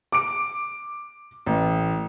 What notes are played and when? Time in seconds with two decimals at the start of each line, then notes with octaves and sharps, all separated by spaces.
0.12 D6 D7
1.46 A1